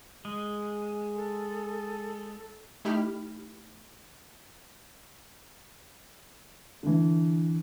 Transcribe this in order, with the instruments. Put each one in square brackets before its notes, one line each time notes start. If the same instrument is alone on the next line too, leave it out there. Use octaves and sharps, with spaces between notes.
[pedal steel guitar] G#3 [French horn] G#4
[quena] A4
[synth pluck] A3 D#4 E4 G4 B5 F6
[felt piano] D3 E3